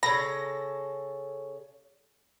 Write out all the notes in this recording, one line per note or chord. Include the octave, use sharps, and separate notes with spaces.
C#3 E3 A4 B5 A#6